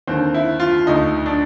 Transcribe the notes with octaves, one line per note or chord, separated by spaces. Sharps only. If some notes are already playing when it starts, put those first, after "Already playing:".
D#2 D3 C4
E4
F4
D2 D3 D#4
D4